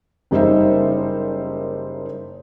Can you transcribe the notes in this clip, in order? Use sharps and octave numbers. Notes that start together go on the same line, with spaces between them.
F#1 G3 D#4 C5 E5